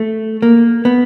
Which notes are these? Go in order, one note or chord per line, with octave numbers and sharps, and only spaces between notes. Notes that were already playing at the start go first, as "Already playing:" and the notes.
Already playing: A3
A#3
B3